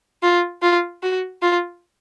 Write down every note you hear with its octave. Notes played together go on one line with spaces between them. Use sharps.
F4
F4
F#4
F4